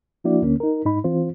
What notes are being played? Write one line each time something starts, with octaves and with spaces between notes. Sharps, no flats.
F3 A#3 D4 E4 F#4 D5
D2 D3 A#3 C#4
D#4 A#4
G#2 D#4 B5
E3 C4 F4 C5